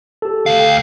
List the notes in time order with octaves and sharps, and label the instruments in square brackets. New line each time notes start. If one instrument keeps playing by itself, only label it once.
[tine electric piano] G4 A4
[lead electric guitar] D2 F5
[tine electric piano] G5